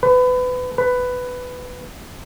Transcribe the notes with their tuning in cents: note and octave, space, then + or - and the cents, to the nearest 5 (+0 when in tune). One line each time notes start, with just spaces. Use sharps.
B4 +25
B4 +10